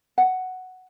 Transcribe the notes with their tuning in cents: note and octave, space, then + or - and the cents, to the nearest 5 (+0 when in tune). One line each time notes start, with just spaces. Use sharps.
F#5 +5